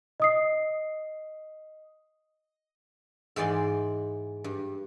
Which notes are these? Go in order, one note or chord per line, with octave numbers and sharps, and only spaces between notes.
D#5 D#6 C7
G#2 E3 G#3 D5 C6
G2